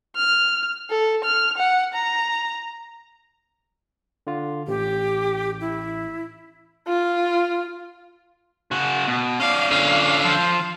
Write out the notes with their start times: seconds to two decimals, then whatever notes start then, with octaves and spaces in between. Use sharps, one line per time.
0.16 F6
0.90 A4
1.24 F6
1.57 F#5
1.94 A#5
4.27 D3 F4
4.68 A1 G4
5.61 E4
6.88 F4
8.71 C#3 F#4
9.07 B2
9.40 C#4 D5 F5
9.71 D3 F4 F5
10.25 F3